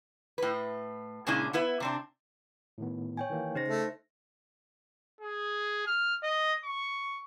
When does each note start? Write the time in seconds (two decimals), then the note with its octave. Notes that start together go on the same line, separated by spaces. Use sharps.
0.38 A2 B4
1.27 A#2 C#3 G#3 C#4 D4 E4
1.53 B3 E4 B4 E5
1.80 C3 C4 D4
2.78 A2 D#3 B3
3.17 C#5 G5 G#5
3.30 D#3 E3 A#3
3.55 C#3 D#4 C5 A#6
3.68 A3
5.21 G#4
5.87 F6
6.23 D#5
6.64 C#6